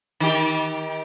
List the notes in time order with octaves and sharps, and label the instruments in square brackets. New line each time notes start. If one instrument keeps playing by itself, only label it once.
[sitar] D#3 G4